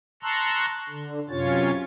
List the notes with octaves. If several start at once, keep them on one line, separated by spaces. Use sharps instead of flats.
A5 A#5 C6 C#6 E6 F#6
D3
F#2 C3 C#4 F4 C#5 A6